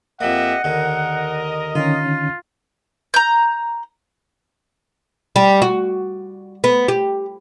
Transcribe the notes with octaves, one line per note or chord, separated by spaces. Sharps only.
F2 A#3 G4 D#5 E5 F#5
D#2 D3 A#4 D#5
D3 D#3 C#4 D#4 F4
A#5 G6
G3
F#4
B3
G4